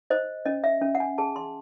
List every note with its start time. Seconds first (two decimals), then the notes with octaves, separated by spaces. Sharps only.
0.10 C5 D#5
0.45 C#4 D#5
0.64 E5
0.82 C#4
0.95 F#5
1.00 G#5
1.18 G#4 A5
1.36 C6